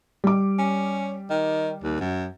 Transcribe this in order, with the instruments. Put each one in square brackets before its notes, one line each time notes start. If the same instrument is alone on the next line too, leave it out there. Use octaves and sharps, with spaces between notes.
[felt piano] G3 D6
[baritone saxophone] C#4
D#3
D#2
F#2